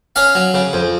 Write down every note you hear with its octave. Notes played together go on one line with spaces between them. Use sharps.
C#4 F5
F#3
C#3
F2